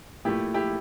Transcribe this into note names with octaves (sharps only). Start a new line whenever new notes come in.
A#2 A3 E4 G4
E4 G4